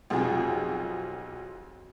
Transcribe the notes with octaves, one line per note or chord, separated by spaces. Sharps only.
B1 F2 C3 F4 G#4